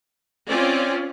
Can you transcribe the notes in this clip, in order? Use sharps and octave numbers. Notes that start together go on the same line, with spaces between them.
C4 C#4 F4 D5